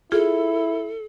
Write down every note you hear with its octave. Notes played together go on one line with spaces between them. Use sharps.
E4 F4 G#4 A4